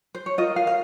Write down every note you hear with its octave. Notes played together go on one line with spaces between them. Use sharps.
C5
C#5
F4 A#4 D#5
F5
F5